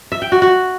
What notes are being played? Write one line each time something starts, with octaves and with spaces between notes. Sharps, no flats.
E5
G5
F#4
F#4